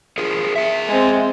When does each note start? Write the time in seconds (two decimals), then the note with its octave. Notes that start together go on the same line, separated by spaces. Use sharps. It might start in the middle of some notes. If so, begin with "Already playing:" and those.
0.18 F4 G#4 A#4
0.56 G#4 E5
0.88 G#3 C4